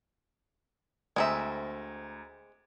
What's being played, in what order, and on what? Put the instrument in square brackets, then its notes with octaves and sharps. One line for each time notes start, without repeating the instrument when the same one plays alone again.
[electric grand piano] D2 A#5 [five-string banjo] G#3 C4 E5